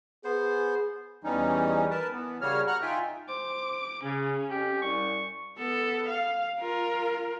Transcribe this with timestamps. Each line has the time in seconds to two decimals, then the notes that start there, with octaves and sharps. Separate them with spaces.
0.24 B3 G#4 C5
1.24 E2 E3 G3 C#4 D#4
1.90 A#4 B4 A5
2.12 E3 B3
2.41 C#3 G3 A#3 F#4 C#5 F6
2.67 F#5 A#5 C#6 F6 F#6
2.82 D#4 F4 E5 G5 G#5
3.29 C5 D6
4.04 C#3 C#4
4.50 F2 G4
4.82 C2 C#6
5.58 B3 A4
6.08 F5
6.59 F4 A#4